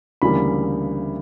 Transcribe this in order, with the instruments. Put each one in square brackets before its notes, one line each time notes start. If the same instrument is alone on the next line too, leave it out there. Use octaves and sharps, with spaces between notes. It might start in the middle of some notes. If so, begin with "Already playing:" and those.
[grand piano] D2 C#3 E3 G3 A#3 B5